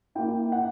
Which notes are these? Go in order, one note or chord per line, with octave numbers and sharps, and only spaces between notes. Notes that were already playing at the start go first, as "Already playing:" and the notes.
A#3 E4 G5
F#5